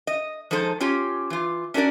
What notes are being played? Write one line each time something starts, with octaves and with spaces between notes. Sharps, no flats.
D#5
F3 G#3 D#4 A4 C5
C#4 F4 G4 C#5
E3 F4
C#4 D4 F#4 A#4 D5